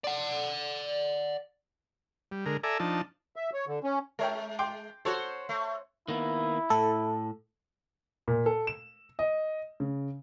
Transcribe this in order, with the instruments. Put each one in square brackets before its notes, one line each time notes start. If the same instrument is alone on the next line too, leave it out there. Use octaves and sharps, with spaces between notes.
[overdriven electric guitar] D5 F#5
[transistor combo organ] G3
D3 G#3 A#4
A4 D5 E5 G#5 A#5
F3 D4 D#4 A5
[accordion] E5
C#5
D3
C#4
[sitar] G#3 [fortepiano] A#4 C#5 G5
[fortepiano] G5 C6 D6
[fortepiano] F#4 A4 [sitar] C5 C#5
[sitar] A3
[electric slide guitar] D#3 A#3 B3 [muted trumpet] E4
[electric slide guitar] A2 [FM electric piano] A4
[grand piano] A#2
A4
E7
D#5
C#3